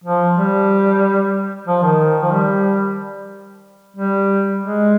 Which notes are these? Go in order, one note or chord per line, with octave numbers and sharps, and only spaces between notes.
F3
G3
F3
D#3
F3
G3
G3
G#3